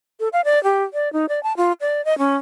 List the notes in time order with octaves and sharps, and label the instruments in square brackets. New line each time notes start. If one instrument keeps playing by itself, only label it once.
[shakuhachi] A4
F5
D5
G4
D5
D#4
D5
A5
F4
D5
D#5
C#4